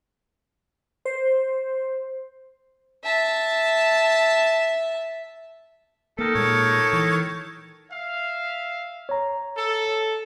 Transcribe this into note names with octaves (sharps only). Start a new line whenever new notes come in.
C5
E5 A5
D#3 A#3 A4
A#2 G#3 C#5
E3
E5 F5
C#5 A#5
A4